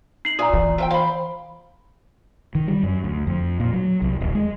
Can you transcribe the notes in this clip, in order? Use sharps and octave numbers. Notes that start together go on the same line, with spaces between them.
D#4 C7 F#7
A#2 E5 G#5 A#5 D#6
E3
F3 C4 E5 G5
C5 F5 B5
D#3
G3
F#2
D2
F2
A#2
F#3
C2
D#1
G#3